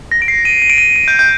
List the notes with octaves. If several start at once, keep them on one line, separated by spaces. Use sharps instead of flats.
A#6
D7
C7
D#7
D#7
D7
D#7
D7
G6
G6